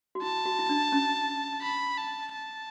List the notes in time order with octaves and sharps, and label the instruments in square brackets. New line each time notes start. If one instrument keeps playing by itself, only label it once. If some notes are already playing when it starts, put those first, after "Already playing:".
[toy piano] F#4
[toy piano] E4 [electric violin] A5
[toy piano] F#4
E4
D4
C#4
[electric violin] B5
A5
A5